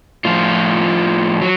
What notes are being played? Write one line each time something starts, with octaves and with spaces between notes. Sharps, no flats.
A2 F3 F4
F#3